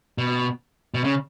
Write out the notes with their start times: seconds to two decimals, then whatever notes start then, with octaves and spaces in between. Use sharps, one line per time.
0.18 B2
0.94 B2
1.04 C#3